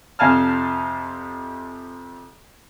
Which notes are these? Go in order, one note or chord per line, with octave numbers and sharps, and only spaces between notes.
F2 C3 F5 G#5 A5 F6